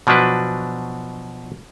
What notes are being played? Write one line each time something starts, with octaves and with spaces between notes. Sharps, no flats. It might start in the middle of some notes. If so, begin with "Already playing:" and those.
B2 F3 F#3 D4 B4